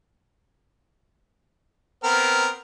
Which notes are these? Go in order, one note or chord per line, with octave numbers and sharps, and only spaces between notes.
B3 C4 A#4